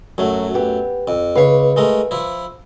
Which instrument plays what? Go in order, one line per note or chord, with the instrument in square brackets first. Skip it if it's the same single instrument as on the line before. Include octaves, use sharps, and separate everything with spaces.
[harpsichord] F#2 A3 [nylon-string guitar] F#3
[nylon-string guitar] B3 G4
[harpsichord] F2
[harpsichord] C#2 C#5 [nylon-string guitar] B4 F5
[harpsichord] G#3 A3 A#4
F3 E4